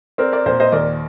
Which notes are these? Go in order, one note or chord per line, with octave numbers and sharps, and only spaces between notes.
C4 A#4 D5
A#4 D5
A#2 C5
C5 D#5
D#2 A#4 D5